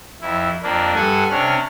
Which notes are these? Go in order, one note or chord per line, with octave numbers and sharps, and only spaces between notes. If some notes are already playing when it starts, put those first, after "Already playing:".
F2 E4
F2 A#3 D4
G2 A4 F#5 G#5
C3 C#4 D4 F6